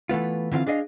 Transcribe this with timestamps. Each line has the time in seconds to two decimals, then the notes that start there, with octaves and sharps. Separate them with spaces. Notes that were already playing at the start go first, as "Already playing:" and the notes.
0.09 E3 A3 B3 F4
0.51 D3 E3 C4 F4 F5
0.67 D4 G#4 D#5 F5